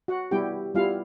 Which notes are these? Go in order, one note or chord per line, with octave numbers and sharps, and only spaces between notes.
F#4 F#5
G3 B3 E4 G4 G5
G3 B3 E4 F4 G4 F5